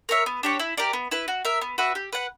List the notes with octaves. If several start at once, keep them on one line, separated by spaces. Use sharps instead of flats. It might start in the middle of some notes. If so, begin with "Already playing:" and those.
A#4 C#5 E5
B3
D4 G4 C#5
E4
G4 A#4 D5
B3
E4 B4
F#4
A#4 E5
B3
F#4 B4 E5
G4
B4 F#5